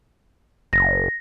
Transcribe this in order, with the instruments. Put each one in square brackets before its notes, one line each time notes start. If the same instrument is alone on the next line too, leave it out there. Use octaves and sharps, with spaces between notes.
[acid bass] F#1 [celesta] A#6